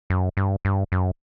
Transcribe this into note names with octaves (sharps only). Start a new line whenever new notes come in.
F#2
G2
G2
F#2